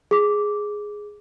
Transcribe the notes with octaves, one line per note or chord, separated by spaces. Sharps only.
G#4 D6